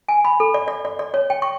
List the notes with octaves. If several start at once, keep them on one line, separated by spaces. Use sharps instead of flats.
G#5
B5
A4
D5
D5
D5
D5
C#5
G5
C#6